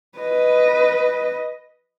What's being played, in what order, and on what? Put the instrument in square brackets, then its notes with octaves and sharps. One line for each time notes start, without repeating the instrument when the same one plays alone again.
[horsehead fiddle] B4 D#5